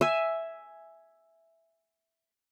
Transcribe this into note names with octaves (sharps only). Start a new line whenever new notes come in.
E5 G#5